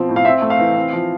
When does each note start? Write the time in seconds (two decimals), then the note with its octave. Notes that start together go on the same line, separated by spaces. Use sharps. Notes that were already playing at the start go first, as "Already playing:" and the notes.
Already playing: B2 F3 C4
0.09 A2
0.16 F5
0.25 C4 E5
0.42 A3
0.50 F5
0.59 E3
0.76 C4
0.93 F3